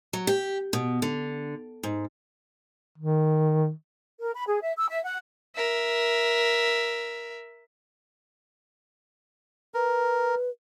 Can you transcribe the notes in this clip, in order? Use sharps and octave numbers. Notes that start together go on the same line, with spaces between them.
F#3
G4
B2
D3
G#2
D#3
A#4
B5
G#4
E5
E6
E5
F#5
A#4 E5
A#4 B4